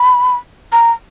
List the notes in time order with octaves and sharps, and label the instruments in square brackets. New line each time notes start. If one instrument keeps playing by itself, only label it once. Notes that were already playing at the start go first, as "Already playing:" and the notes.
Already playing: [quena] B5
A#5